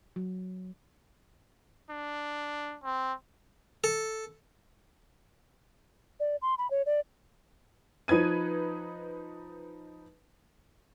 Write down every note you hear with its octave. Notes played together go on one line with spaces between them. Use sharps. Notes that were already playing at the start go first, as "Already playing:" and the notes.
F#3
D4
C4
A4
D5
C6
B5
C#5
D5
F3 D#4 B4 G#6 D#7